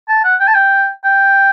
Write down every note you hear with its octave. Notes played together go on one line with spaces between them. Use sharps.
A5
F#5
G5
A5
G5
G5